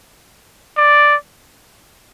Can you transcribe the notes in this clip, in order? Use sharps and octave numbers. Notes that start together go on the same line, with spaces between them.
D5